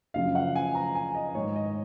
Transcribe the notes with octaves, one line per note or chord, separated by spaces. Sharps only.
F#2 C#3 F3 F5
F#5
G#5
A#5
G#5
D#5
G#2 D#3 C#5
D#5